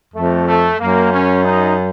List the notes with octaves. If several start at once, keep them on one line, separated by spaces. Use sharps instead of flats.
F2 A3
A3
F#2 A#3
C#4
D#4